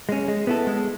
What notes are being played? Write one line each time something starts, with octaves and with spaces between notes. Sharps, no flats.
G#3 C#4
G#3
B3 E4 A4
G#3